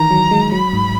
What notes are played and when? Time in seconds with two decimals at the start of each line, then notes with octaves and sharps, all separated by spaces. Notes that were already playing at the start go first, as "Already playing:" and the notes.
Already playing: D#3 E3 A#5
0.11 F#3
0.31 G#3
0.52 F#3 B5
0.73 G#2